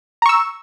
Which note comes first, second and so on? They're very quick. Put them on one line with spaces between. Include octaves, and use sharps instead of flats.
A#5 C#6 E6